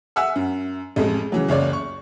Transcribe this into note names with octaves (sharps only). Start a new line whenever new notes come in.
E5 F#5 G#5 E6
F#2
A1 F2 G#3
C#3 E3 F#3
F#1 C#2 C#5 D5
C#6